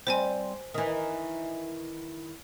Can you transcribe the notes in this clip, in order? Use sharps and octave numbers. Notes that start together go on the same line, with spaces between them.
G3 C4 C5 G#5
D#3 E3